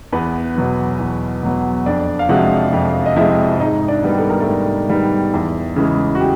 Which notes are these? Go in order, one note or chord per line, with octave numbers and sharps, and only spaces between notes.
E2 B3 B4
B2 F#3 B3
E2
B2 F#3 B3
F2 D4 D5
F5
C3 F3 G#3 F#4 F#5
F2
D#5
C3 F3 G#3 E4 E5
G#2 D#4 D#5
D4 D5
D#3 G3 B3
A4
A#4
A3 A4
G#2
D#3 G3 B3
E2
C#3 E3 G#3
F#4
G4